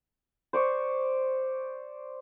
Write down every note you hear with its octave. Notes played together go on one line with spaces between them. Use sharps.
C5 D5 C#6